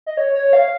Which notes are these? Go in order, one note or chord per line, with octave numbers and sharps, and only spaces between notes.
D#5
C#5
C#5
F5